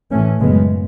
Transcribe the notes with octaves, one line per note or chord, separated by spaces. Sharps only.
A2 E3 A3 C#4
F#2 C#3 G#3 B3